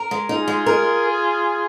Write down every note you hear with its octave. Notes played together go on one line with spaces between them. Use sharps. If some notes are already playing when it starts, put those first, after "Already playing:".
Already playing: A#4
G#3
D#4 F4 G#4
G#3
A#4